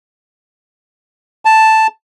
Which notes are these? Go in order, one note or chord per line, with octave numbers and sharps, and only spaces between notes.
A5